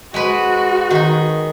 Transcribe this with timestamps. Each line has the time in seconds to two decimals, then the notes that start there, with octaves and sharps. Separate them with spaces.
0.14 G#3 F#4 B4
0.90 D#3 D#4